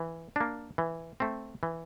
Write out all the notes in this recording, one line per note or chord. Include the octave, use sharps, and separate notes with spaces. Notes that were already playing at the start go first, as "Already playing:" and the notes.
Already playing: E3
A#3 D4
E3
A3 C4
E3